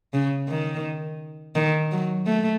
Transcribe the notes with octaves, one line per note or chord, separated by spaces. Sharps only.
C#3
D#3
D#3
F#3
A3